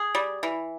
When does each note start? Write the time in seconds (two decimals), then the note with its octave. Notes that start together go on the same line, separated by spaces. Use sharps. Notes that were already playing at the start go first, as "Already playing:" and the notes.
Already playing: G#4
0.15 G3
0.43 E3